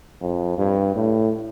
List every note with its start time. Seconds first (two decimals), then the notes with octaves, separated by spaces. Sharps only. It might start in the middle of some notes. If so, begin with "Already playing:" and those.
0.21 F2
0.58 G2
0.96 A2